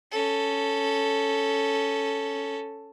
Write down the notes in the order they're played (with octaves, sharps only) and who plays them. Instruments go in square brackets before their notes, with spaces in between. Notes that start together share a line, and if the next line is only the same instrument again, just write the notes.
[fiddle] C#4 A4